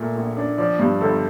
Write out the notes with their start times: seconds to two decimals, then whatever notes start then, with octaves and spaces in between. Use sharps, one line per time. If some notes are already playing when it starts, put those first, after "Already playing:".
Already playing: A#2 A3
0.15 A#1
0.37 D4
0.58 F3 D5
0.79 G2
1.01 G1 A4